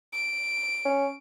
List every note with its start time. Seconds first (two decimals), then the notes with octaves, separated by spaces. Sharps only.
0.12 D7
0.85 C#4